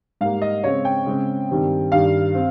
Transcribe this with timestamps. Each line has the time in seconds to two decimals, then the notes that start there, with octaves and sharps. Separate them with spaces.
0.21 G#2 G3 A#3 F5
0.42 D#5
0.63 C#3 G#3 C4 C#5
0.85 G5
1.06 C#3 G#3 C4
1.49 G2 D#3 G3 C4
1.92 G2 D#3 G3 F5
2.35 C4